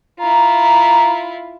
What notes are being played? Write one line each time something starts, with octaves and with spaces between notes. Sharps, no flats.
E4 F4 A#5